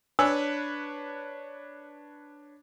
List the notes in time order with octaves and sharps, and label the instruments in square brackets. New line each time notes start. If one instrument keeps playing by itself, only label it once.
[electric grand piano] D4 B4 C#5 [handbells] G#5 E6